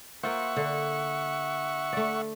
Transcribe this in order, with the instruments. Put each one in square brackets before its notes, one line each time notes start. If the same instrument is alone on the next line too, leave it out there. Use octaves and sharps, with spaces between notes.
[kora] A#3 F4 C5 [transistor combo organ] E5 F#5 C#6
[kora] D3
A3 D5